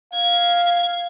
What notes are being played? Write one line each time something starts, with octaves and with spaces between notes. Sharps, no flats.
F5 G#6